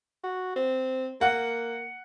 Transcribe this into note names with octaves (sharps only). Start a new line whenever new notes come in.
F#4
C4
A#3 F#5